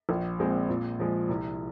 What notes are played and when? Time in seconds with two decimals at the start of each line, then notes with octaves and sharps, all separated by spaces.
0.09 A#1
0.39 A#2 G#3 C4
0.69 A#2
0.99 F3 G#3
1.29 C2